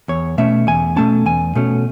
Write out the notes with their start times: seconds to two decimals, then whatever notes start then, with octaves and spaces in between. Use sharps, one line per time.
0.08 E2 C#5
0.38 B2 A3 C#4 E5
0.67 E2 G#5
0.96 B2 A3 C#4 A5
1.26 E2 G#5
1.55 B2 A3 C#4